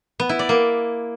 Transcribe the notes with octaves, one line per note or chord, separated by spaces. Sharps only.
B3
E4
D5
A#3